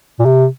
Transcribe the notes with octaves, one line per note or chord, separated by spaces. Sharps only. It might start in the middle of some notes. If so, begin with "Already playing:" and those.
A#2
C3